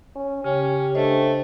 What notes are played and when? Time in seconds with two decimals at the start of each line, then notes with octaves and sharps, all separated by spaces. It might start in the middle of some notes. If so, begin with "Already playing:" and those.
0.15 C#4
0.44 C#3 C#4 G4
0.95 A3 D4 C5 D#5